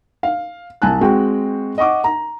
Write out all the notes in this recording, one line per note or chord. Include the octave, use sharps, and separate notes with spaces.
F5
C2 G#5 A5 F#6
G#3 C4 F#4 G5
D#5 F#5 C#6 D6
A#5